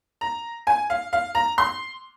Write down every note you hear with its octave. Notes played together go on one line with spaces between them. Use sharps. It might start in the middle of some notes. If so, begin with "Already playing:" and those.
A#5
G#5
F5
F5
A#5
C6